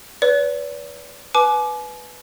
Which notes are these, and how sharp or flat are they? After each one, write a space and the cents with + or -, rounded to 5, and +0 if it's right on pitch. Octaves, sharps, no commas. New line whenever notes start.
B4 +0 D5 -45
B4 +0 G#5 +40 D6 +10